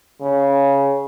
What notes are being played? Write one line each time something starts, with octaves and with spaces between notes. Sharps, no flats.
C#3